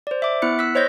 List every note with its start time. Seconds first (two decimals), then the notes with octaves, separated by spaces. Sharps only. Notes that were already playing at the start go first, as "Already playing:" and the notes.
0.07 C5 D5
0.22 E5 D6
0.42 B3 E4 F#6 C#7
0.59 E6 F#6 B6
0.75 C5 C#5 D#5 G6 A#6